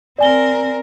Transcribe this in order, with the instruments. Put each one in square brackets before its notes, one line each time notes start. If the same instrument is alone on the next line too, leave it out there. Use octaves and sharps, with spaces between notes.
[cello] C4 A#4 [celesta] D5 G#5 G7